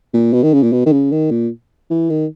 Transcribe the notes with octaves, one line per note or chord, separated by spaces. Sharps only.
A#2
B2
D#3
C#3
A#2
B2
D#3
C#3
D#3
A#2
E3
D#3